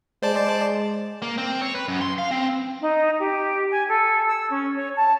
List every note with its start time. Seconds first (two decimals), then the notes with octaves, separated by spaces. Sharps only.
0.23 G#3 C5 D5 A5
1.22 A#3
1.38 C4
1.61 C#5
1.75 B4
1.88 F#2
2.01 C6
2.18 F5
2.31 C4
2.81 D#4
3.19 G4
3.71 G#5
3.88 A4
4.27 E6
4.50 C#4
4.76 C#5
4.96 A5